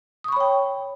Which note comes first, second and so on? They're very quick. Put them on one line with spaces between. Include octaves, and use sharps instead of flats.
D#6 C#6 B5 C#5 G5